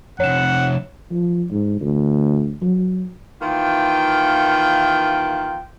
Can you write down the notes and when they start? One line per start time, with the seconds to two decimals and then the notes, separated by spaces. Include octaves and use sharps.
0.20 F2 C3 C#5 F#5 E7
1.11 F3
1.52 G#2
1.81 D2
2.62 F#3
3.42 D#3 E3 A#3 F4 G5